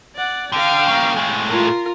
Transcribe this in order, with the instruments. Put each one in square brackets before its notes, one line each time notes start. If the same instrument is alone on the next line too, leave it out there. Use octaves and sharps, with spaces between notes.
[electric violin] D5 F#5
[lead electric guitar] D3 [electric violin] F5 G5
[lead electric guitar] C#3 A#3
A2 G#3
[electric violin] F4 A#4